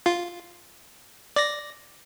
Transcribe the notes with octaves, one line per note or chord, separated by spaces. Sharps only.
F4
D5 A#6